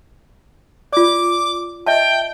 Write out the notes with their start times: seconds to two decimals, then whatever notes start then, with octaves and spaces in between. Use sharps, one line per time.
0.93 F4 D5 D6
1.86 D#5 E5 G5 A5